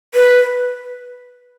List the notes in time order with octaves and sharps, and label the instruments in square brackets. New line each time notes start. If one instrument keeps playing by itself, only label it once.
[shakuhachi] B4